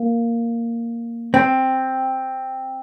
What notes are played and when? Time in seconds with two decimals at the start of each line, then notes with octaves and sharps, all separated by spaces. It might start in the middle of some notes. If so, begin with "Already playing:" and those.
Already playing: A#3
1.34 C4